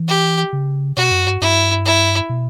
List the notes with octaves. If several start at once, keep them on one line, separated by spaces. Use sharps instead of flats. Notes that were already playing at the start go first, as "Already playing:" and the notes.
Already playing: E3
G4
C#3
B2 F#4
F#2
G2
G2 E4
E4
B2